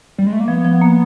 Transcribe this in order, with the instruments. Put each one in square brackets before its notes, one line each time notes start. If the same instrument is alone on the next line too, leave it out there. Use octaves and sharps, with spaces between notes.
[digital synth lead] G3
G#3
A3
A#3
[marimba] F3 [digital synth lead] B3
[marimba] F3
A#3